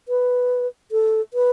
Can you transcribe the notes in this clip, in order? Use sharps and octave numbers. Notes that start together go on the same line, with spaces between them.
B4
A4
B4